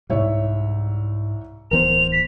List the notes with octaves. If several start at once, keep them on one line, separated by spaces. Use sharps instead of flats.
C2 G#2 G3 C#5 E5
D1 E3 B3 A#4 C5 F7
B6